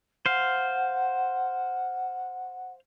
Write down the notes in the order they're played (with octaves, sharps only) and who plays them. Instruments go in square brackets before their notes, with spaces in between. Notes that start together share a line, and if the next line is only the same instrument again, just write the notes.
[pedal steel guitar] C5 F5 [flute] F#5